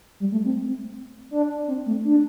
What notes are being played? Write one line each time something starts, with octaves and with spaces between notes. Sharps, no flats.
G3
A3
C4
D4
C4
A3
D4